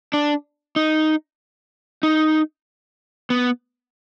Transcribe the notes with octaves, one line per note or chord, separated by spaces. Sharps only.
D4
D#4
D#4
B3